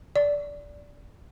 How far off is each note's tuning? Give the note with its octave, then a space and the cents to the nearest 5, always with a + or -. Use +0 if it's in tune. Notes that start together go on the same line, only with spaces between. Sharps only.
D5 -15